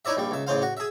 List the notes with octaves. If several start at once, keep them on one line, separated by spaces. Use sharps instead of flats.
D#4 E4 C#5 D5 E5
A#1 G3
C#2 E5
A1 C#3 C5 F5
F#4
G#4 E5